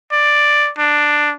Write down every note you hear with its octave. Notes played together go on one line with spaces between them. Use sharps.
D5
D4